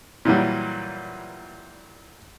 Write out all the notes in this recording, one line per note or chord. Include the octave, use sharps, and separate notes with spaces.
A#2 E3 F#3 G3